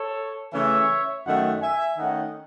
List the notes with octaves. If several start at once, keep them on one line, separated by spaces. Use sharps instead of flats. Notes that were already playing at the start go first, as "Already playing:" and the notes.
Already playing: A4 C#5
C#3 E3 A3 C#5 E5
F#2 D#3 A3 C#4 D#5 F#5
E5 G#5
D#3 A3 C#4 D#5 F#5